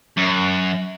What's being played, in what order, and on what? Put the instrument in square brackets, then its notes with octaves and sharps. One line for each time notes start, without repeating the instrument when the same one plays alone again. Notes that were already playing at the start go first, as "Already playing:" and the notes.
[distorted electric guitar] F#2